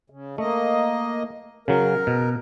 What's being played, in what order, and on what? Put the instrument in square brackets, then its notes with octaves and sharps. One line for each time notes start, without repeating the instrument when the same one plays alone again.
[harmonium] C#3
[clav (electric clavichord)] A3 [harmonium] A#3 D#5
[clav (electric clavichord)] C#3 F#3 [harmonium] A#4
[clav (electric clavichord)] B2